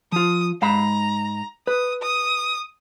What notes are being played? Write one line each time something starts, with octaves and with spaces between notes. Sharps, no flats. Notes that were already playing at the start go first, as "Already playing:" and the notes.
F3 F4 D#6
G#2 F5 A#5 B5
B4 D#6
D#6